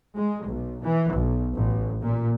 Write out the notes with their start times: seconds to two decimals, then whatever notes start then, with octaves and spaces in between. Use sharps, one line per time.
0.16 G#3
0.46 B1
0.83 E3
1.14 B1
1.54 A1
2.01 A#2